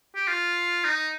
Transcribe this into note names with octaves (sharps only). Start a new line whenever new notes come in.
G4
F4
D#4